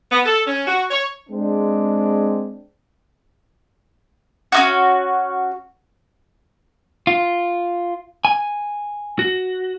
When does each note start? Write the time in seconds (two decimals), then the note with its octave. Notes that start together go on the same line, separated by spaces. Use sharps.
0.11 B3
0.25 A4
0.47 C#4
0.67 F#4
0.91 C#5
1.30 G#3 C4 D4
4.52 C#4 D#4 F#4
7.07 F4
8.25 G#5
9.19 F#4